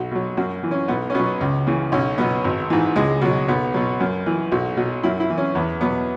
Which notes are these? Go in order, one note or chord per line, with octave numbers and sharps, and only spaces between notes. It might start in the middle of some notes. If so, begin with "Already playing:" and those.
Already playing: B1 F#4
B2 F#3
F#2 F#4
E3
C#4
B1 B3
C#4
B2 F#3 B3
C#2
C#3 E3
B1 C#4
B2 F#3 B3
G#1
G#2 E3
C#2 G#3
B2 F#3
B1 B3
B2 F#3
F#2
E3
B1 F#4
B2 F#3
F#2 E4
E4
E3
C#4
E2 B3
B2 F#3 B3